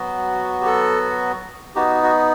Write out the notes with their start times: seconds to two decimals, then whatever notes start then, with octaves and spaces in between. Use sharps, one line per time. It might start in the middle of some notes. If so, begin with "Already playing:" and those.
Already playing: F#3 B3 F#4
0.61 G4
0.66 A4
1.75 B3 D#4 F#4 G4
2.03 F#4